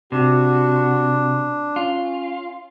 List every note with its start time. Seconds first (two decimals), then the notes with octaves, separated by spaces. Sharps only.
0.12 C3 D4 F#4
1.76 C#4 F4